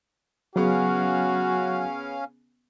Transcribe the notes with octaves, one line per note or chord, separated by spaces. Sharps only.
C#3 F#3 B3 C#4 F#4 F5